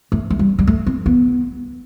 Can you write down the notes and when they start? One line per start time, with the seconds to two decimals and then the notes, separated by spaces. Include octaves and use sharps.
0.12 A3
0.30 A3
0.39 G3
0.59 G3
0.67 A3
0.87 C4
1.06 B3